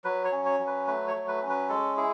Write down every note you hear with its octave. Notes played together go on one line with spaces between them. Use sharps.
F#3 B4
C#5
C#4
C#5
F#3
B4
A3 B4
C#5
F#3
B4
C#4
B4
G#3 A4
E4 G#4